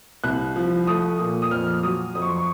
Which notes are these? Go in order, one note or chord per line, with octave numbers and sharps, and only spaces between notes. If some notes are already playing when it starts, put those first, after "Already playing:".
C2 F#6
F3
A3 D#6
A#2
D#6
F2 F6
F#3 D#6
F2 D#6
C#6
C6
C#6